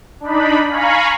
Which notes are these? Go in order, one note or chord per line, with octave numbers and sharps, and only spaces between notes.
D4 D#4 B5
F5 G#5 A#5 B5 C#6